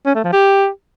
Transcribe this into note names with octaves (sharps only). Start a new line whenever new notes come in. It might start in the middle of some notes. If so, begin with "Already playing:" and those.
C#4
A3
F3
G4